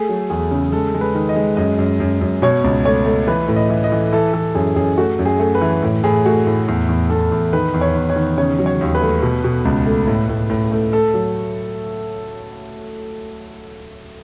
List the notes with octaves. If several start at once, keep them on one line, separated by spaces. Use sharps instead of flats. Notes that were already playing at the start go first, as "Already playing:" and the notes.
Already playing: A3 G#4
F#3
E2 G#4
C#3
G#3 A4
G#3
B4
D#3
D#5
G#3
F#2 D#5
F#2
F#2
F#2
B2 C#5
C#2
A3 C#5
A3
E3 B4
A2
D#5
E3
D#5
E3
E3 A4
E3 A4
F#2 G#4
F#2 G#4
A3 F#4
F#2
G#4
A3
B4
E3
A2
A2 G#4
A3 F#4
A2
E2
E2
E2 A4
E2
D#3 B4
E2
C#5
E2
C#5
D#3
C#3 C#5
F#3
C#5
D#2
B4
A3
B2
B2
C#2
A3
A2
A2
A2
A3
A3 A4
F#3